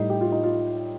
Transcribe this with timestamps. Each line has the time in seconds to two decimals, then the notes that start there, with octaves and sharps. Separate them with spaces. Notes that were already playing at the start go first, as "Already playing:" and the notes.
Already playing: A2 G3 D#4
0.10 G4
0.21 F4
0.32 D#4
0.44 F4